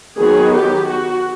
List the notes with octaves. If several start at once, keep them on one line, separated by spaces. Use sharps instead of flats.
D#3 F#3 B3 D#4 G#4
G4
F#4